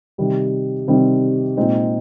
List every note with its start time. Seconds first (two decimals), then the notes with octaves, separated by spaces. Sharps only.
0.18 C3 D#3 G3 C4
0.88 C3 D#3 G3 C4
1.57 A#2 G#3 C4 D#4